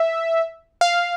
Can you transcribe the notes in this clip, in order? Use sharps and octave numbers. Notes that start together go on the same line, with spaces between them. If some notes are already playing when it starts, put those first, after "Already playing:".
Already playing: E5
F5